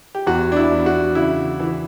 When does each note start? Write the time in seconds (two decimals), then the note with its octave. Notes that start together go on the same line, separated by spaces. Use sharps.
0.15 G4
0.27 E2 F#4
0.52 D4
0.57 E4
0.72 E2
0.86 F#4
1.15 C#3 E4
1.60 E3